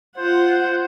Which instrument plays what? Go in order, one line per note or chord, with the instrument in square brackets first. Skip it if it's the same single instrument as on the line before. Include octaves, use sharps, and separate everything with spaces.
[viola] F4 F#5 [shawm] C5